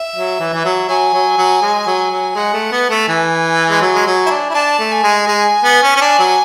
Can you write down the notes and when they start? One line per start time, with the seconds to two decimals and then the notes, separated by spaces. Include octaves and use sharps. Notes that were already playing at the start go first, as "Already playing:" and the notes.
Already playing: E5
0.16 F#3
0.40 E3
0.54 E3
0.65 F#3
0.89 F#3 G#5
1.13 F#3
1.38 F#3
1.62 G#3
1.87 F#3
2.11 F#3
2.35 G#3 F#5
2.54 A3
2.72 B3
2.90 A3
3.08 E3 G#5
3.70 G#3
3.81 F#3
3.94 G#3
4.06 F#3
4.26 E4
4.30 D4
4.50 E4
4.55 D4 A5
4.79 A3
4.92 G#5
5.03 G#3
5.27 G#3
5.64 B3
5.83 C#4
5.96 C#4
6.01 D4 G#5
6.19 F#3